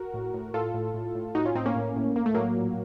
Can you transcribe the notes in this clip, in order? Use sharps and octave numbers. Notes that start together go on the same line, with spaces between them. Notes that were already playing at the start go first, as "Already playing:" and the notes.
Already playing: F#4 A#4
A2
A2
A2 F4 A4
A2
A2
A2
A2 D#4 F#4
C#4 F4
A2 C4 D#4
A#3 C#4
A2
A2
A2 A#3
A3
A2 F#3 A#3
A#2